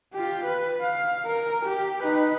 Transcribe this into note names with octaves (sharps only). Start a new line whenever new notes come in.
F4 G4
B4
F5
A#4
G4
D#4 B4